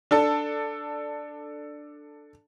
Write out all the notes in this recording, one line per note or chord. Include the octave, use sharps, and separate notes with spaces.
D4 A4 A5